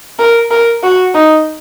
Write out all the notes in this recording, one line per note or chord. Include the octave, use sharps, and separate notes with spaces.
A#4
A#4
F#4
D#4